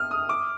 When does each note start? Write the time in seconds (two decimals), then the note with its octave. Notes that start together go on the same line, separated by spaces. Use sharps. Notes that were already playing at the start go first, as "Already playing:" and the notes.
Already playing: D#6 F6
0.11 D#6
0.29 D6